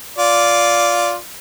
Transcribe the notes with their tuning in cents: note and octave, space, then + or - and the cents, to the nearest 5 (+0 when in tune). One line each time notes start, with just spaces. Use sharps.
F4 +0 D5 -10